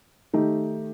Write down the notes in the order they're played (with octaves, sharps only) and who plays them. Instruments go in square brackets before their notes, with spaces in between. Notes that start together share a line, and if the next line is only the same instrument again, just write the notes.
[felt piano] D#3 A3 D#4 G4